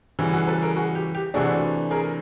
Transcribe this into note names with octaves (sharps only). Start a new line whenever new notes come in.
C#3 E3 G3 F#4 G#4
F#4 G#4
A4 B4
G#4 A#4
F#4 G#4
G4
G4
C3 E3 A3 D4 F#4 G#4
G#4 A#4